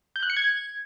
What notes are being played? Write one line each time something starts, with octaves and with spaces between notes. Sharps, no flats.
G6
F#6
C#7
G#6